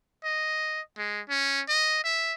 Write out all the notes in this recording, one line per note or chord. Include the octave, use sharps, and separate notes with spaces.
D#5
G#3
C#4
D#5
E5